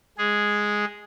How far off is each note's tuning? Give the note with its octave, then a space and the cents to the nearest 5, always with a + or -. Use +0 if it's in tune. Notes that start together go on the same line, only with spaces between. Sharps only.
G#3 +0 G#4 +0